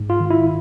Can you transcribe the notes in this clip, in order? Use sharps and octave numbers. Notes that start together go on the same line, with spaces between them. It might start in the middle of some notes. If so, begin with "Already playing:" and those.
Already playing: G#2
F4
D#3
E4